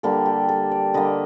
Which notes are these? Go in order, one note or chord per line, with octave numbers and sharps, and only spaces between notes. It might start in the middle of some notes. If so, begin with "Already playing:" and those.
D3 G3 A#3 A4
G4
A4
D5
D3 G3 A#3 D#5